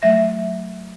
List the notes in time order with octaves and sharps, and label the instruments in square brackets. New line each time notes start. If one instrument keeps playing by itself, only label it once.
[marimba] F#3 A3 E5 A#6